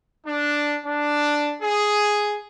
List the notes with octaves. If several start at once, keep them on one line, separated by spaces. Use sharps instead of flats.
D4
D4
G#4